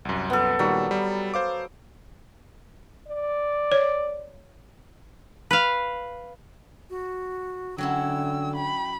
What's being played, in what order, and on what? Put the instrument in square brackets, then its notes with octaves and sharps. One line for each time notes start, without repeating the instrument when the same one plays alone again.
[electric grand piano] C2 F#2
[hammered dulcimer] B3 A4
[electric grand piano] A#2 D#3 G3 [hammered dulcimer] F#3
[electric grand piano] G3
C5 F5 D6
[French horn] D5
[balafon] C#5
[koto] B4 F5
[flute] F#4
[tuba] D3 [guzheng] F#3 C#4 E4 [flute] G5 [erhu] E6
[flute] G5 [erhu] B5